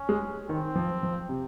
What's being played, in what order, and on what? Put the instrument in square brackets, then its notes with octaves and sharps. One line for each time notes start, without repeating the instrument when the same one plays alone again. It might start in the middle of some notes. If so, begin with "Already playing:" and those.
Already playing: [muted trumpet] C#4
[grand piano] G#3
[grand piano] D#3 [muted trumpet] C4
[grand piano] F3
F3
C3